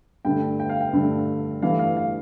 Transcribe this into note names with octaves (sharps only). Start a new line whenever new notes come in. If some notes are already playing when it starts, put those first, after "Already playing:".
G2 D3 A3 G5
G5
F5
G5
G2 D3 A3
G2 E3 A3 F5
F5
F5